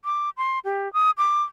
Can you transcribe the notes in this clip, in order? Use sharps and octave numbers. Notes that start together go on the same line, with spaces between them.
D6
C6
G4
D#6
D6